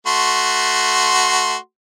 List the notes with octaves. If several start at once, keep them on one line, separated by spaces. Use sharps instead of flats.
A3 F#4 C6